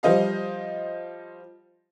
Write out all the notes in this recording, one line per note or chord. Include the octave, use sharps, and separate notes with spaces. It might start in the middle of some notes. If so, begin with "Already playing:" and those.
F3 G3 C5 D#5 F5